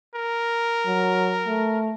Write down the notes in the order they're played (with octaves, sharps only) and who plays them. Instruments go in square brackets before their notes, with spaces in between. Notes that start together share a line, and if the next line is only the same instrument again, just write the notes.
[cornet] A#4
[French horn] F#3
A3